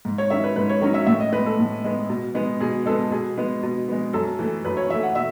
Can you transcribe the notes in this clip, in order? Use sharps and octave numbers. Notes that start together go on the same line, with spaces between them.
G#2
C#5
D#3 F#3 C#4 E5
B4
G#2 B4
C#5
D#3 F#3 C#4
E5
A2 E5
D#5
G#3 B3 B4
A4
A2
G#3 B3
B2
G#3 B3
B2 G#4
G#3 B3 A4
B2 G#4
G#3 B3
B2
G#3 B3
F#2 A4
E3 A3
F#2 B4
C#5
E3 A3 E5
F#5
B2 E5